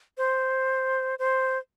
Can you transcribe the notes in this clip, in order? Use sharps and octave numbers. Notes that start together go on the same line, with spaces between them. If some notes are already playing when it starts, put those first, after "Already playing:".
C5
C5